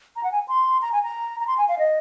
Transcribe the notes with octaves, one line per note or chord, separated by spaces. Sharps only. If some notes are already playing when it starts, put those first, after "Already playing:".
A#5
F#5
G#5
C6
A#5
G#5
A#5
A#5
C6
G#5
F5
D#5